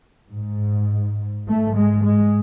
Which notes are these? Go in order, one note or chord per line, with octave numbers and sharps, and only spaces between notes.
G#2
G#2 A3
G#3
G#3